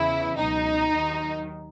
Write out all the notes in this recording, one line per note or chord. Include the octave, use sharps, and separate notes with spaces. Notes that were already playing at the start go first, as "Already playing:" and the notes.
Already playing: E2 C#3 E3 E4
C#2 B2 F#3 D#4
D#2 D#3 F#3